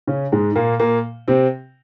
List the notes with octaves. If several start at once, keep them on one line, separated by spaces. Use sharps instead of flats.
C#3 C#4
G#2 G#3
A#2 A#3
A#2 A#3
C3 C4